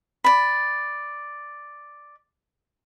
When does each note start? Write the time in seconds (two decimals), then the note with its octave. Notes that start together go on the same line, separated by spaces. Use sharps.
0.24 D5 B5